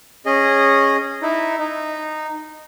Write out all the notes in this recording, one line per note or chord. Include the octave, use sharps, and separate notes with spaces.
C#4 G#4 D#5
D#4 E4
D#4